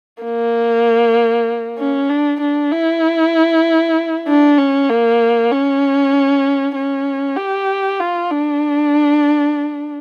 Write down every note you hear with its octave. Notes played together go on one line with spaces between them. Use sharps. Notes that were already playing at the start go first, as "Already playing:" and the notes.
A#3
C#4
D4
D4
E4
D4
C#4
A#3
C#4
C#4
G4
F4
D4